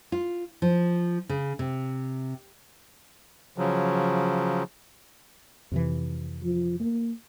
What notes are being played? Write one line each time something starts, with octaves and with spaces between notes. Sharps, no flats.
F4
F3
C#3
C3
C#3 F3 F#3
F2 C3 E3
F3
A#3